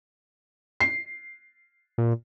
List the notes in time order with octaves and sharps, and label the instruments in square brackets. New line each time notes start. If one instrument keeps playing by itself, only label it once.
[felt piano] C7
[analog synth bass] A#2